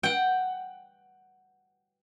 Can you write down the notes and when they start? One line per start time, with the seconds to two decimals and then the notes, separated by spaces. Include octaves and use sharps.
0.03 F#5 G5